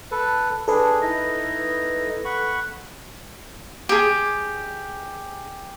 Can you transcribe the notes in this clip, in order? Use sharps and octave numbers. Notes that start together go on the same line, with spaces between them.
A4 B4
D4 G#4 A4 B4
D#4 E4 D#5
F#5 B5 C#6
G4 G#4